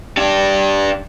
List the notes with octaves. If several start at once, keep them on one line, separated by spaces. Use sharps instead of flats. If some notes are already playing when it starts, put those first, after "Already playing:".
D4 G4